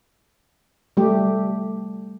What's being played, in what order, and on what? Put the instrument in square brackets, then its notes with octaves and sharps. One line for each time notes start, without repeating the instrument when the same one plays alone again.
[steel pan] G3 A3 G4